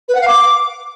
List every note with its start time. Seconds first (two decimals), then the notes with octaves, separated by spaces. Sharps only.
0.09 B4
0.15 F#5
0.21 F5
0.28 D6